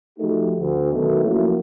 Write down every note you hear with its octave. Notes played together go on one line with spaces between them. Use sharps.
F3 A3 D#4 F#4 G4 A4
D2
B1 F#2 B2 D#3 A3
F3 F#3 A3 A#3 C#4 E4